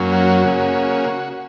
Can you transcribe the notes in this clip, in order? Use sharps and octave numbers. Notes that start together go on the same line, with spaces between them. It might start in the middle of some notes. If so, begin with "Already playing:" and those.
Already playing: F#2 F#3 A#3 C#4
F#4
C#3 A#3 C#4